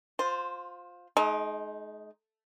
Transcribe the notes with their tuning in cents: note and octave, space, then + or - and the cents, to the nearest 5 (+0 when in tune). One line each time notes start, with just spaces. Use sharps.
F4 +20 C5 +0
G#3 +40 D#4 +0